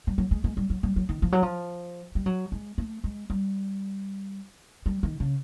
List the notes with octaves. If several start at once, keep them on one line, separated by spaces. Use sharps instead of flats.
G3
F#3
G#3
G#3
G3
F#3
G3
F#3
D#3
F3
F#3
F3
G3
F#3
G#3
A3
G#3
G3
G3
D#3
C#3